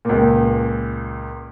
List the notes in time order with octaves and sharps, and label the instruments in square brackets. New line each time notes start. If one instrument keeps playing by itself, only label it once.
[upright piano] C#2 A#2